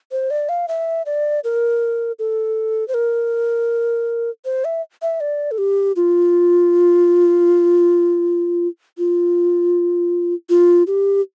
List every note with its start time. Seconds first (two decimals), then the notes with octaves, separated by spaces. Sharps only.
0.12 C5
0.31 D5
0.49 F5
0.68 E5
1.06 D5
1.44 A#4
2.19 A4
2.88 C5
2.94 A#4
4.45 C5
4.65 E5
5.02 E5
5.21 D5
5.51 A4
5.58 G4
5.96 F4
8.98 F4
10.49 F4
10.87 G4